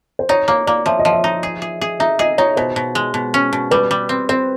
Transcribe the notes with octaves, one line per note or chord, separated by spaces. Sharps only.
C5
D#4 C#5
A#3 C#5
A#3 D5
F3 E5
D#5
F3
E5
D#4
G#4
G#4
G#4
D#4 E5
G#4 D#5
D#4 C#5
B2 C5
B2
G#3
B2
C#4
B2
G3 B4
G3
C4
C4 C5